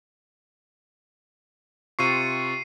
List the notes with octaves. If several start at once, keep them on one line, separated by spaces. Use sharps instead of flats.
C3 F4 C#6 C7 C#7 D#7